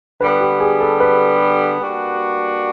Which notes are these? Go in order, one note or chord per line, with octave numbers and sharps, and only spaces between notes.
D3 G3 B3 B4
G4
G#4
A4
B4
G3 A#3 D4 F#4